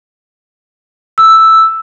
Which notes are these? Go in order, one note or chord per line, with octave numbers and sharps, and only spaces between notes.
E6